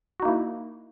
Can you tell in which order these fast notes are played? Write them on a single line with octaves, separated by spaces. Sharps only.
F#4 D#4 A#3 E4